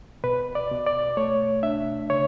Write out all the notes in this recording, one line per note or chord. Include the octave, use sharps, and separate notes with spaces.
B2 B4
D5
B2
D5
A3 C#5
D4 E5
C#3 C#5